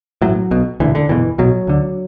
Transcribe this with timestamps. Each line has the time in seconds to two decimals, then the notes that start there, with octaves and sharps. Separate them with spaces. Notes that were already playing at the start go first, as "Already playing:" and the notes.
0.22 A1 A2 F#3
0.51 B1 B2
0.80 E1 D2 D3 E3
0.95 D3
1.09 F#1 E2 B2 E3
1.38 B1 B2 F#3
1.67 D2 D3